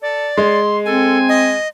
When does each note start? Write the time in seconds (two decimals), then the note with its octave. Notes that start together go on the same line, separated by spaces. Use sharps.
0.02 A4 D5
0.37 G#3 C6
0.86 C4 A4 G#5
1.29 D#5